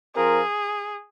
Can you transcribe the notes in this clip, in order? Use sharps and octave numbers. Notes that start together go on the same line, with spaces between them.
F3 C4 F4 G#4 A#4